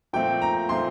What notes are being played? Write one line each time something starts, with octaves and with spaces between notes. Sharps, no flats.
A#2 F3 A3 C4 G5
A#5
A#2 F3 A3 C4 C6